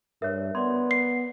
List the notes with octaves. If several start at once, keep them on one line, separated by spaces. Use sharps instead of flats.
G2 A#4 C#5 E5
B3 D5 C6 G#6
C7